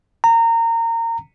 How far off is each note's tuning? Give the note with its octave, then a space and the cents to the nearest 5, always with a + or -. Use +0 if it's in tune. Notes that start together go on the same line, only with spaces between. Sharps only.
A#5 -25